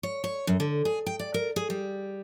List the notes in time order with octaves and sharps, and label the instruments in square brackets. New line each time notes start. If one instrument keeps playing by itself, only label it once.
[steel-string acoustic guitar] C#5
C#5
F#2
D3
G#4
G5
D5
A#4
G#4
G3